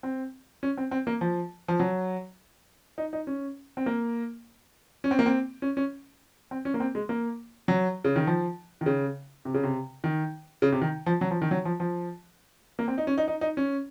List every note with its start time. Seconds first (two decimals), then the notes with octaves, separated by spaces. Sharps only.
0.03 C4
0.63 C#4
0.78 C4
0.91 C4
1.07 A#3
1.21 F3
1.68 F3
1.80 F#3
2.98 D#4
3.13 D#4
3.27 C#4
3.77 C4
3.86 A#3
5.04 C#4
5.11 C4
5.19 A#3
5.26 C4
5.62 C#4
5.77 C#4
6.51 C4
6.65 C#4
6.74 A#3
6.80 C4
6.95 G#3
7.09 A#3
7.68 F#3
8.04 C#3
8.16 D#3
8.27 F3
8.81 D#3
8.86 C#3
9.45 C3
9.54 C#3
9.63 C3
10.04 D#3
10.62 C#3
10.72 C3
10.81 D#3
11.06 F3
11.21 F#3
11.31 F3
11.42 D#3
11.51 F#3
11.65 F3
11.80 F3
12.79 A#3
12.88 C4
12.98 D#4
13.07 C#4
13.18 D#4
13.28 D#4
13.41 D#4
13.57 C#4